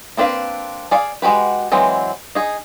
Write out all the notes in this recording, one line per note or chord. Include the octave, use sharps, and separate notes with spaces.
A#3 C4 D4 B4 F5
G#4 D5 F5
G#3 F#4 G4 B4
E3 F#3 G#3 C4
D#4 G#4